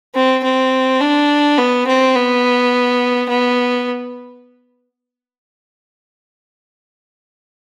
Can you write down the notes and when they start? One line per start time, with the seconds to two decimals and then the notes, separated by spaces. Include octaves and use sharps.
0.15 C4
0.44 C4
1.00 D4
1.58 B3
1.87 C4
2.15 B3
3.29 B3